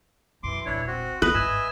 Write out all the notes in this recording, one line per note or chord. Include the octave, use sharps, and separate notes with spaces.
B1 F#2 E3 C6 D6
E1 A#1 D4 E4 C#5
C4 F#4
A3 F4 B4 D#5
G1 G#2 E5 G#5 E6